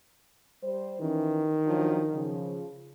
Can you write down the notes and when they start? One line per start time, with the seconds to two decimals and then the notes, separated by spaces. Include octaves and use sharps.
0.63 G3 C5
1.01 D#3 E3 C#4
1.66 F3 F#3 D4
2.14 C#3 F3